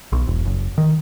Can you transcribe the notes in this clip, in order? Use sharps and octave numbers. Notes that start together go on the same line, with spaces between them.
B1
E1
F#1
D#3